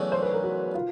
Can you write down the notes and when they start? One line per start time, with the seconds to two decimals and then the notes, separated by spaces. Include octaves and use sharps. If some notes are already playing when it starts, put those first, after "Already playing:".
Already playing: E2 C#3 F#3 A3 D4
0.12 C5
0.22 B4
0.34 A#4
0.43 F#4
0.74 F4